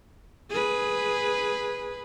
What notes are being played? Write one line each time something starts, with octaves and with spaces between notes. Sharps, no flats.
G#4 B4